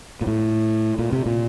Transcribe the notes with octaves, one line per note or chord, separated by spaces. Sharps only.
A#2
A2
A#2
C3
A#2